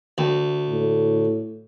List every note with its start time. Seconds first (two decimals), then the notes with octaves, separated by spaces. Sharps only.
0.18 D2
0.69 A2